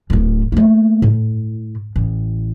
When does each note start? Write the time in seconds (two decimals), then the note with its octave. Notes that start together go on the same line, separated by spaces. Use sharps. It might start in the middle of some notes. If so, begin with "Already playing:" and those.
0.10 D1 A2
0.52 A3 A#3
1.02 A2
1.96 A1